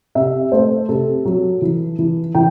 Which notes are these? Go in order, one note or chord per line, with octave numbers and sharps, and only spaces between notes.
C3 E5
A3 C5
C3 A4
F#3
E3
E3
E3 G5